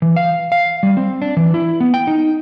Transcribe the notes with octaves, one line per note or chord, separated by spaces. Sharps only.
E3
F5
F5
G3
C4
D4
E3
E4
B3
G5
D#4